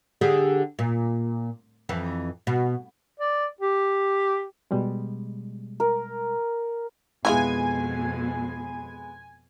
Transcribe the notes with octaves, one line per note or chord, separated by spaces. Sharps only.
D3 G4 G#4
A#2
F2 E3
B2
D5
G4
B2 G3 G#3
A#4
F2 B2 E3 G#3 B3 F4 G#4 G#5